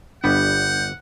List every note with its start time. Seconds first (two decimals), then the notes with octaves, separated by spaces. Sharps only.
0.24 G1 G3 B3 D4 F#5 G6